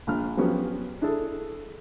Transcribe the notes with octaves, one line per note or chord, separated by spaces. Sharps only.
A#1 A#2 F6
F3 F#3 B3 C#4 G4
D4 E4 G#4 A4